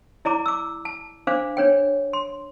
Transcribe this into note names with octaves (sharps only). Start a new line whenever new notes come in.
E4 D5 A#5 D6
D6 E6
A5
D4 C5 F5 D6
D4 C#5 G5
C6